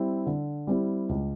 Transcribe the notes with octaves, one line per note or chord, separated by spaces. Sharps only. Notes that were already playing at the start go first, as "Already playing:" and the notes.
Already playing: G3 C4 E4
D3
G3 C4 E4
C#2